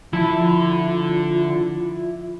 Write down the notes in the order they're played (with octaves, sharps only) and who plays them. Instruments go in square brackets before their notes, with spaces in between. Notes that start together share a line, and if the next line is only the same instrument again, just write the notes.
[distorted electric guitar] D3 A5 [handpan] F3 [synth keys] E4 [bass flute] F4